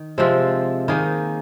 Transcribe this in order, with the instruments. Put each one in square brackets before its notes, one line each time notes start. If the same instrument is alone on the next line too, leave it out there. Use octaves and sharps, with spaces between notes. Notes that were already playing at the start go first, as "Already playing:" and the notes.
Already playing: [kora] D#3
C3 F3 G#3 C4
D#3 A#3 D#4 G#4